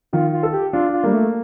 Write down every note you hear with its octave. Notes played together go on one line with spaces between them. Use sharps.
D#3 F4
F4
A4
G4
D4 F4
F4
G3 A#3
A3